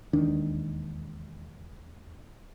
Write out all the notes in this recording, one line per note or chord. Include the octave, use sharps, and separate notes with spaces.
E1 D#2 D#3 D4